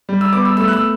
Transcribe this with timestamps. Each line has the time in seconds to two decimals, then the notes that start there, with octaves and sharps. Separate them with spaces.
0.09 G3
0.21 E6
0.33 B3 D6
0.45 E6
0.57 A3 E6
0.68 F#6
0.73 E6